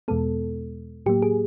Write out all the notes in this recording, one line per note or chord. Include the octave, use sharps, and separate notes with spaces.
E2 B2 G#3 B3 A4
A2 F#3 A#3 G4
G#4